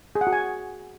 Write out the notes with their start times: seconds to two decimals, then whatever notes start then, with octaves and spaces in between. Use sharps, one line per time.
0.15 G#4
0.21 F#5
0.27 F#4
0.33 G#5